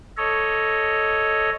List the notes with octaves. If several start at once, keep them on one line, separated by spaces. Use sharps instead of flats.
A4 C#5 D#5